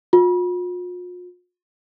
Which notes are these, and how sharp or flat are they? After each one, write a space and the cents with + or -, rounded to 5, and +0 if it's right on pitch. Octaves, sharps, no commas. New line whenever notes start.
F4 +45